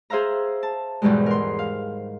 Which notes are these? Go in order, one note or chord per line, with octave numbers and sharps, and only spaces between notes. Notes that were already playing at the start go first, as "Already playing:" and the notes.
G#4 C5 E5 F5 A#5
A5
E2 G#2 B2 D#3 G3 G#3
A#4 C6
F5